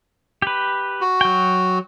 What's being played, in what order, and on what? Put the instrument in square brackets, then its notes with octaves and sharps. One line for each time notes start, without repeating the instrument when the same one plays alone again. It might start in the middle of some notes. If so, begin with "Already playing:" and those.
[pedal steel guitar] G4 B4
[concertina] F#4
[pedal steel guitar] F#3 G5